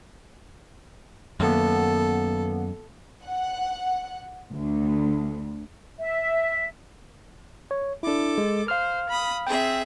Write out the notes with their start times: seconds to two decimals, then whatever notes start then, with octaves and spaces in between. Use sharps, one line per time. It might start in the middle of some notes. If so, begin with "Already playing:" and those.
1.40 F#2 D#3 A#3 B3 A4
3.24 F#5
4.54 D2
6.00 E5
7.71 C#5
8.03 D4 E4 A4 D6
8.38 G#3
8.68 C5 F5 F6
9.09 B5 D#6
9.47 C4 G#4 E5 G5